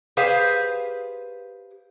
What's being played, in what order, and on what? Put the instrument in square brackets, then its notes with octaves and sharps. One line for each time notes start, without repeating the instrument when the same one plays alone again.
[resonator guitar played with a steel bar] G4 G#4 B4 C5 F5